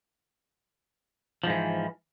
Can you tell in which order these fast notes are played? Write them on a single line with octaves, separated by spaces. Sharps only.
F3 G#2 E3